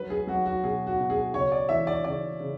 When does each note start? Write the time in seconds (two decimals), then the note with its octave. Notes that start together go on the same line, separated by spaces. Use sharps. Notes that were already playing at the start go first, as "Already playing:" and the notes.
Already playing: F#3 B4
0.10 G#4
0.27 F#3 F#4
0.46 F#4
0.63 B2 G#4
0.87 F#4
0.99 B2
1.10 G#4
1.34 C#3 C#5
1.52 D5
1.69 E3 E5
1.87 D5
2.04 C#3 D5
2.39 C#3